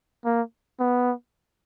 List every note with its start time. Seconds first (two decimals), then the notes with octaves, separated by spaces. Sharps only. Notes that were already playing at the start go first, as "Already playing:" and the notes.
0.25 A#3
0.80 B3